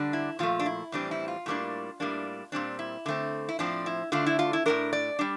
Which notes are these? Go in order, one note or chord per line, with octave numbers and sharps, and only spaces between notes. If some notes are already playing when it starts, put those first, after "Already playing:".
Already playing: D3 G3 D4
E4
A#2 F3 A3 F4
D4
E4
A2 E3 G3 C4 D4
E4
F4
A2 G3 A#3 D4
A2 G3 A#3 D4
A#2 G3 C4 D4
E4
D3 A3 C4
E4
A2 F3 C4 D4
E4
D3 A3 D4 F4
E4
F4
E4
A2 G3 D4 A#4
D5
G3 D4